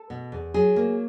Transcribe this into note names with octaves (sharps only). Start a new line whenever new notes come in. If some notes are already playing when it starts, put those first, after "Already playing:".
Already playing: A4
B2
E2
F#3 G#4
A#3